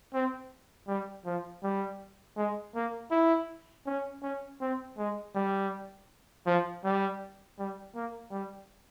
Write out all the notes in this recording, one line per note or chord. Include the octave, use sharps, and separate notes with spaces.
C4
G3
F3
G3
G#3
A#3
E4
C#4
C#4
C4
G#3
G3
F3
G3
G3
A#3
G3